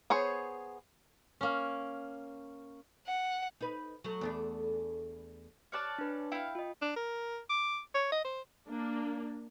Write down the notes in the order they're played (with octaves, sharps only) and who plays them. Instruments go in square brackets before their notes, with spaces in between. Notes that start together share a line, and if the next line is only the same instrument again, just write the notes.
[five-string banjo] B3 G#4 C5 C#5
[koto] A#3 C#4
[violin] F#5
[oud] D#4 B4
F#3 A3
E2 A3 D4
[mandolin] C#5 D5 A5 [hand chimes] F6 F#6
[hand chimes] D4 B4
[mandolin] E4 F5 [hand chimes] G5
[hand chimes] F4 D#5
[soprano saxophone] D4
A#4
D6
C#5
D#5
C5
[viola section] A#3 D4